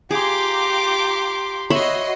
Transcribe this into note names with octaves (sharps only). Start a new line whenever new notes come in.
F4 G4 G#4 A#5 C6 D6
F#4 C#5 D#5 E5 B5 C6